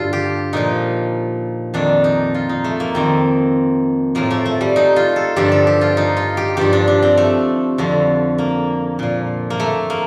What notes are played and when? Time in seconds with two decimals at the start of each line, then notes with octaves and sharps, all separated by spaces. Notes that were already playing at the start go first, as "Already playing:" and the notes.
Already playing: G2 D3 D4 F4 A4
0.13 G4
0.53 A#2 F3 D#4
1.74 F2 D#3 D4
2.04 D#4
2.34 F4
2.49 D#4
2.64 A3
2.80 A#3
2.95 F2 D#3 C4
4.15 A2 F3 A#3
4.31 A3
4.46 A3
4.61 G3
4.76 D#4
4.96 F4
5.16 A4
5.36 G2 D3 F3 G4
5.52 A4
5.67 G4
5.81 F4
5.97 D#4
6.17 F4
6.37 G4
6.57 G2 F3 G4
6.73 D4
6.88 D4
7.02 C4
7.17 A3
7.78 F2 D3 F3
8.38 A#3
8.99 A#2 F3
9.50 A#3
9.60 A3
9.90 A#3